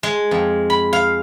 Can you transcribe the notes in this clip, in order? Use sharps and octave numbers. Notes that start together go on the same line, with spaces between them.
G#3
F2
B5
F5